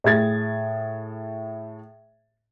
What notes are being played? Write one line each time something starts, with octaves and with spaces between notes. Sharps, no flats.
A2 G#4 G#6 A6